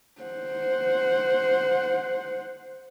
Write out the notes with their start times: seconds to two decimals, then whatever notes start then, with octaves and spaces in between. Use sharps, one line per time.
0.21 C5 F#5